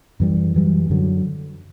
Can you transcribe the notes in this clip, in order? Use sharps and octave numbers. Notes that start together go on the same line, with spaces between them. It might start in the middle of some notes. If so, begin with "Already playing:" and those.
F#2 E3 G3
F#2 E3 G3
F#2 D3 F#3